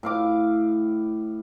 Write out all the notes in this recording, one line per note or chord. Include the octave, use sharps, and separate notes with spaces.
A2 F5 D6